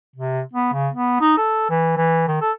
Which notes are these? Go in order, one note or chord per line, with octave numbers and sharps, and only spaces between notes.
C3
B3
C#3
B3
D#4
A4
E3
E3
D#3
A4